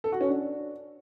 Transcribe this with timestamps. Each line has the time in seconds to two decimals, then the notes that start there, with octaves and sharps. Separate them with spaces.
0.04 A4
0.12 F#4
0.21 C#4
0.29 D4